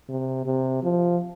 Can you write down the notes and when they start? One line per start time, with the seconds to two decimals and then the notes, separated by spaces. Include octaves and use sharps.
0.09 C3
0.46 C3
0.83 F3